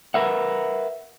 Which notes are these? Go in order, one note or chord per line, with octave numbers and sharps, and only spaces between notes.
A#4 B4 E5 F#5